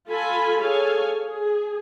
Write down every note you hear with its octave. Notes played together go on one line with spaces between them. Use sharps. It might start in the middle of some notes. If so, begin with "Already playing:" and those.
F4 A4 G#5 B5
G#4 A4 C#5 F5 G#5
G#4